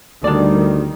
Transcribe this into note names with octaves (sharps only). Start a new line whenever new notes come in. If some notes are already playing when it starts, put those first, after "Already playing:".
D2 D#3 G3 D4 D5